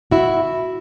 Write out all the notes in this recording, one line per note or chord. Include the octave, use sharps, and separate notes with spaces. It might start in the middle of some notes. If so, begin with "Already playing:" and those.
E4 F#4